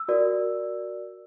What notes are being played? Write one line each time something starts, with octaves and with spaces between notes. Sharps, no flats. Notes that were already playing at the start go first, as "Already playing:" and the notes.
Already playing: E6
F#4 A#4 D5